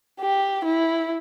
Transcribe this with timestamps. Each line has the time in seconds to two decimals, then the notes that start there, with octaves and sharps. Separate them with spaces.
0.20 G4
0.64 E4